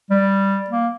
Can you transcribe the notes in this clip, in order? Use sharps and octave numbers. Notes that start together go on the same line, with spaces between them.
G3
A#3